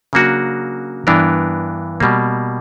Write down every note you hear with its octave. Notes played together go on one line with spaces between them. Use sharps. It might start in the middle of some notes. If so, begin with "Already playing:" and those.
C#3 F#3 A#3 D4 F#4
G2 E3 B3 D4 A#4
B2 G3 A#3